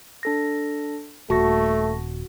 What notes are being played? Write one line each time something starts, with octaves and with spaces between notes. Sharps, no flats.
D4 A4 A#6
D#1 A3 F#4 A5 C#6 A#6